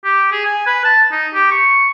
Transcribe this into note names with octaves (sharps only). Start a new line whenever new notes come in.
G4
G#4
G#5
B4
A5
D#4
G4
C#6